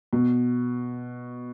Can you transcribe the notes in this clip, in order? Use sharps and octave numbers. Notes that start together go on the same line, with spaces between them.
B2